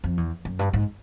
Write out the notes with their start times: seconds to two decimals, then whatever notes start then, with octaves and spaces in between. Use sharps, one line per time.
0.04 F2
0.17 E2
0.45 F#2
0.59 G2
0.74 G#2